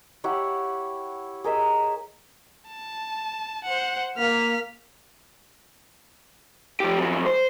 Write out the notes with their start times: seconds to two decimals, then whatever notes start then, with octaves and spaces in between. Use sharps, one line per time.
0.24 E4 G4 C#5 F#5
1.44 G#4 A#4 D#5 E5
2.67 A5
3.64 C5 F#5
4.18 A#3 F6 B6
6.80 F3 G4
6.98 F#2 F3
7.26 C5